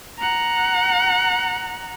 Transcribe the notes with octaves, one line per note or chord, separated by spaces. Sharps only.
F#5 A#5